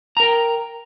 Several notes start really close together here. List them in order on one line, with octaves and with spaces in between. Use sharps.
A#5 A#4 G5